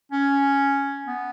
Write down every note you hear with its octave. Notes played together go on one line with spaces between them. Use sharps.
C#4
B3